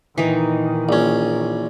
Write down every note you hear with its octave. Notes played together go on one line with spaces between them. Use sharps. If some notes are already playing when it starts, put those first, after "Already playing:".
A#2 D#3 E3 D#4
A#1 C#4